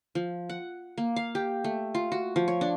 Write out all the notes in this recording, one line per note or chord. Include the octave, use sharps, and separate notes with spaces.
F3
F#5
A#3
F5
G4
A3
F4
F#4
F3
C#5
D4